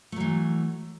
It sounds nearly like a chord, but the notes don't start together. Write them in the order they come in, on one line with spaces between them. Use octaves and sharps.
A3 F#3 E3